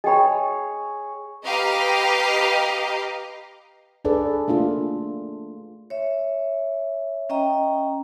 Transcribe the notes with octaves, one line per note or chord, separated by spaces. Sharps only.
G#4 C#5 D#5 G5 B5
G4 B4 D#5 F5 A#5
D4 G#4 A4 B4 D5
A3 A#3 D4 F4
C#5 E5
C#4 D#5 G5 A#5